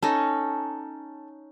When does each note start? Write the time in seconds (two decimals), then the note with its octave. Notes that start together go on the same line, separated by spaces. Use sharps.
0.03 C#4 D#4 A4